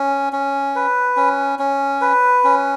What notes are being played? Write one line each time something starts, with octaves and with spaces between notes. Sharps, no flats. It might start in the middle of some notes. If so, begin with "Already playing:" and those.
Already playing: C#4
C#4
B4
C#4
C#4
B4
C#4